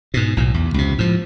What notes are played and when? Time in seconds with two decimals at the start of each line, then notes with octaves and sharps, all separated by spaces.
0.14 G#2 B2
0.37 B1 A2
0.54 E2
0.74 C#2 C3
0.98 A2 F3